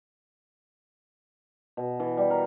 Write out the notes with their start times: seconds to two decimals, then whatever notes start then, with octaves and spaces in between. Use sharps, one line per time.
1.77 B2
2.00 E3
2.17 G3
2.30 A#4